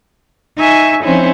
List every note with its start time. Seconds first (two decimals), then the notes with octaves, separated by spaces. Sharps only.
0.57 D#4 E5 G#5 C#6
1.02 F3 C4 C#4 D#4 E4